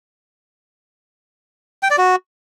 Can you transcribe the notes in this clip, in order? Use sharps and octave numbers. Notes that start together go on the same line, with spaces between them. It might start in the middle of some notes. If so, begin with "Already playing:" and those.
G5
D5
F#4